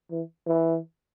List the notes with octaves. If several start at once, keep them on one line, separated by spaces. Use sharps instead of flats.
E3
E3